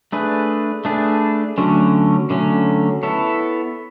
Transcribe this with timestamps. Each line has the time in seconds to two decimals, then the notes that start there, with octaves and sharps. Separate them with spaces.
0.12 A3 D4 G#4 B4
0.85 A3 D4 G#4 B4
1.58 D3 F#3 A3 C#4
2.30 D3 F#3 A3 C#4
3.03 B3 E4 A4 C#5